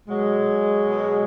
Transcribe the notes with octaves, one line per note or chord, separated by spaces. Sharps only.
B2 F#3 G#3
B2